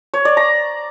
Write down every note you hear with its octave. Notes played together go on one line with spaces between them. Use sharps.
C#5
D5
A#5